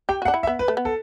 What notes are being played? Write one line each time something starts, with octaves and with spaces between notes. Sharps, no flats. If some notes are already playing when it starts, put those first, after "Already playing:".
G4 G5
F#4
F#5
D4
E4
E5
B3
B4
A3
B3
A4